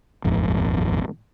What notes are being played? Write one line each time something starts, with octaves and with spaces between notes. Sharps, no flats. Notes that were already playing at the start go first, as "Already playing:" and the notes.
D#1 G#1 F2